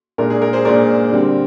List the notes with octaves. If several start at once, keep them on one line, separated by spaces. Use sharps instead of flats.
A#2 G#3 D4 A#4
G#4
A#4
G#4 C5
A#2 G#3 D4 A#4 D5
D3 G3 C4